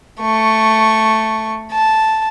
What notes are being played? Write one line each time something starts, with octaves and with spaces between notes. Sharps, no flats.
A3 C#6
A5